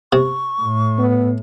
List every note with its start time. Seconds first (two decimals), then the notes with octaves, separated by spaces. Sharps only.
0.13 C3 C#6
0.62 A2
0.99 B3